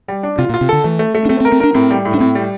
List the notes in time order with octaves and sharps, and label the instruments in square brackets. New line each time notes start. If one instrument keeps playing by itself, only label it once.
[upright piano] G3
D4
[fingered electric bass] C3 [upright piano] F4
[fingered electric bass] A#2
[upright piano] F4
[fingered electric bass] C3
[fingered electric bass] D3 [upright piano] A4
[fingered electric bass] E3 [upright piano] A3
[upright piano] A3
A3
[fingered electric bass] D4
[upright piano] A3 [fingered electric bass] C4
[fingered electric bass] C4
[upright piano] A#4
[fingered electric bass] C4
[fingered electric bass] D4 [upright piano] A#4
[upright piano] A2 [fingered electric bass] C4
[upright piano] G3
A2
[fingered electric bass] D4
[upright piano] A2 [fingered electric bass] C4
[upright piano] G3